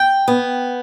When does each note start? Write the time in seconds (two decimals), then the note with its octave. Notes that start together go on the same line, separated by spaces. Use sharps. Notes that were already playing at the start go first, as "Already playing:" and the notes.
Already playing: G5
0.28 B3